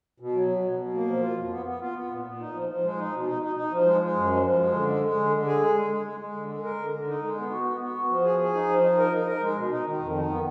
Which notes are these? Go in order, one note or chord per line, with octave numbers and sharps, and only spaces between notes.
B2
F#3
B2
B2
B2
A#3
F3
F4
F2
B3
B3
F4
B3
A#2
A#2
D#4
F3
F3
G#3
D#4
B2
D#4
D#4
D#4
F3
G#3
G#3
F#2
F3
F3
G#3
D3
G#3
G#3
D3
D3
G#4
G#3
G#3
G#3
G#3
G#3
D3
G#3
A#4
D3
D3
D#4
G#3
B3
F#4
B3
B3
F#4
F3
G#4
G#4
D#4
F3
D#4
A#4
D#4
A#4
G#3
B2
D#4
D#3
F2
D#3
B3